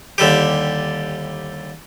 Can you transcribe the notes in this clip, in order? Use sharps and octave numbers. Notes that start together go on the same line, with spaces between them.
D#2 D3 G3 G4